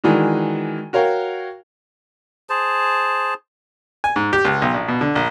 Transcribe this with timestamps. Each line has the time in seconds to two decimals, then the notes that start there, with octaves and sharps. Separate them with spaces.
0.04 D#3 E3 G#3 D4 F#4
0.93 F#4 A#4 C#5 F5 G5
2.50 G#4 C5 A5
4.04 G#5
4.16 G#2
4.33 G4
4.45 C#2
4.62 B1
4.74 A#1
4.88 B2
5.01 D3
5.15 A#1